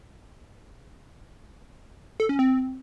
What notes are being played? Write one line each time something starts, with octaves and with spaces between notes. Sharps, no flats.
A4
C#4
C4